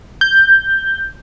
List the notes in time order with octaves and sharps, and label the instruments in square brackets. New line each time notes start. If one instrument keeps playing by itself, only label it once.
[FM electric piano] G6